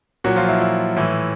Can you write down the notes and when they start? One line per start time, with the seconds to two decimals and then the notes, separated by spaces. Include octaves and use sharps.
0.24 A#2 F#3 F#4
0.36 F3 F4
0.49 E4
0.60 E4
0.96 A2 E3